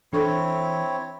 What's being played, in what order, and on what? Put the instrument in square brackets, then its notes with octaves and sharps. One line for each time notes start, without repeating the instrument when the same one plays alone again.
[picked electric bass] E3 [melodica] C4 E4 C#5 [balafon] D4 A4 C#6